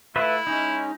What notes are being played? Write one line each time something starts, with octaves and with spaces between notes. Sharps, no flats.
A3 E4 F4 B4 E5
G#3 C#4 D#4